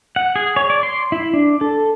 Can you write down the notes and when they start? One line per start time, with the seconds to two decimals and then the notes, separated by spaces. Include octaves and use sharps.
0.16 F#5
0.36 G#4
0.56 C#5
0.70 D5
0.83 C6
1.12 E4
1.33 D4
1.61 A4